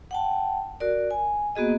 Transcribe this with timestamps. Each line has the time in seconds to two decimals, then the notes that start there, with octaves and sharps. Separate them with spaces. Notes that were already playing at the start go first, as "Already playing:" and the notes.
0.11 F#5 G5 A5
0.80 F#4 A#4 D5
1.11 G#5
1.55 A#3 B3 F#4 G#4 D#5